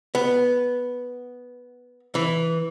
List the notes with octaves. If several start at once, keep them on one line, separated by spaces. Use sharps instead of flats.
B3
E3